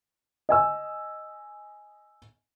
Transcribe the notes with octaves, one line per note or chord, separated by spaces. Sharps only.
D#5 G#5 E6